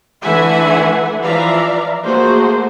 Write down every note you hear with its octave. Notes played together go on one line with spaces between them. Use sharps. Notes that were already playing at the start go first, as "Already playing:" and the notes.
D3 E3 A3 E5 F#5 G#5
E3 F3 D5 E5 F5 A#5
A3 A#3 F#4 G#4 C5